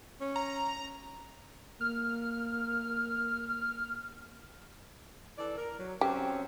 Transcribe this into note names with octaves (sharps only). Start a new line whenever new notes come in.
C#4
A#5
A#3 F6
E3 A4 D5
A#4
F#3
F#3 C4 C#4 G4